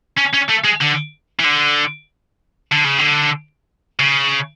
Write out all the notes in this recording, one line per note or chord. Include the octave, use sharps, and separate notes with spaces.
C#4
C#4
A3
G#3
D3
E3
D3
D3
C#3
D3
C#3